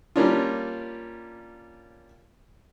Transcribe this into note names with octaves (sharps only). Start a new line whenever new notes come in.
G3 A#3 C#4 D4 F4